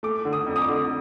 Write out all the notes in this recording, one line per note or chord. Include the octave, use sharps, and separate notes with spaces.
A3 D6
D3
D#6
F2
D#6
D6
D3